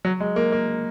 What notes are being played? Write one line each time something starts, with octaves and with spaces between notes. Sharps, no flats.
F#3
G#3
A#3
A#3